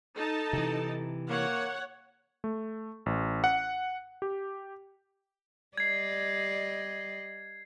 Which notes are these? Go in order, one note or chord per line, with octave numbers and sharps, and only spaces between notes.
D#4 A4 A5
C3 E3
A#3 C#5 F#5
A3
A1
F#5
G4
G3 D5 D#5 G#6 C7